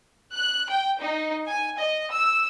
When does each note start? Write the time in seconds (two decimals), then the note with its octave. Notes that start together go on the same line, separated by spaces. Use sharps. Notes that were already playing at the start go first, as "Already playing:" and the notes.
0.33 F#6
0.69 G5
1.00 D#4
1.47 G#5
1.79 D#5
2.11 E6